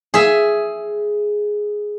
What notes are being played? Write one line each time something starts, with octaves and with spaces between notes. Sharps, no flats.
G#4 E5